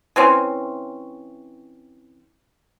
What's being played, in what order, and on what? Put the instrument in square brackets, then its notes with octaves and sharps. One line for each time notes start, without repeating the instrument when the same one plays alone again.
[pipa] E3 C4 C#4